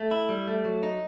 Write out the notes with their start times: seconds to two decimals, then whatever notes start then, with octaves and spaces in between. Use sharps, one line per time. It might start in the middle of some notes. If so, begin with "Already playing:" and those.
Already playing: A3
0.11 E4
0.29 G3
0.47 A3
0.65 F#3
0.83 D#4